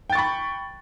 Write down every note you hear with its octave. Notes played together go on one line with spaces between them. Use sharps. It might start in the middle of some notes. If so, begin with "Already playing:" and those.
G5 B5 C#6 A6